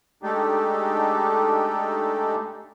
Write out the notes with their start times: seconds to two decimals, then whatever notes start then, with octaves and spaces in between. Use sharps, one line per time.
0.23 G#3 A3 D4 D#4 G4 A4